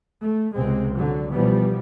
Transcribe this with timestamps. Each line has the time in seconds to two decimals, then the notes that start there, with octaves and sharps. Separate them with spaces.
0.23 A3
0.56 C#2 C3 G#3 C4
0.96 D3 F#3
1.33 B2 E3 F3 G3 B3